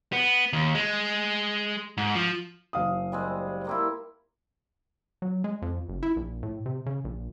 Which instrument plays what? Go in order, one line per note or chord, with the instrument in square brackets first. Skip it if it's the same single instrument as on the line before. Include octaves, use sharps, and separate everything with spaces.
[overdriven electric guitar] B3
D#2
G#3
G#2
F3
[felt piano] F#1 F5 D#6
[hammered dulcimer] G3 G#3 C4
A#3 C4 E4
[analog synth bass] F#3
G#3
F2
F#1
E4
A#1
A2
C3
C#3
A#1